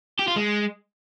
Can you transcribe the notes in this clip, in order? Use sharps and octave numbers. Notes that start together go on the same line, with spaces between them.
G4
F4
G#3